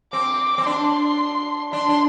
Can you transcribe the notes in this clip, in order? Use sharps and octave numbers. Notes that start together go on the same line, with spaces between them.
C4 D6
C4
D4 C6
D4 C6
D4